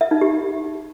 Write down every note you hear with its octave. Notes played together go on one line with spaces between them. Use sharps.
E5
D#4
G4